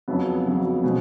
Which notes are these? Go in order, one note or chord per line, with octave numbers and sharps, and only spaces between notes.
F2 C#3 F#3 B3
F2 C#3 F#3 B3
B2 G#3 C4